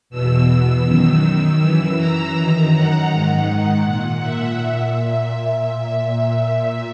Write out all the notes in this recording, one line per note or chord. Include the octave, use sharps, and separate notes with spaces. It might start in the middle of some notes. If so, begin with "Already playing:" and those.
E2 B2 E6
F#2 D#3 E6
E6
F#2 E3
A#5
F#2 D#3
F#5
G#2 D#3 F#5
A#2
E5
A#2
E5